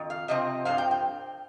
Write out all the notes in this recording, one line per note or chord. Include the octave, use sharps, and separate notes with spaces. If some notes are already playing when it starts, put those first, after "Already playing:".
Already playing: F2 D#3
F5
C3 F3 C4 D#5
G2 F3 C4 F5
G5
G5